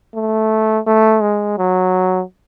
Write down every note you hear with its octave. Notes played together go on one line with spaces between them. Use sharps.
A3
A3
G#3
F#3